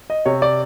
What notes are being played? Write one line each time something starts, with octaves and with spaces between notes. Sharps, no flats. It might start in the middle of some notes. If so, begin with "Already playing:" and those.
D#5
C3 C#5
D5